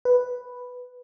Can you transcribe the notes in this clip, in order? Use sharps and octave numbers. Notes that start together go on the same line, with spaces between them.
B4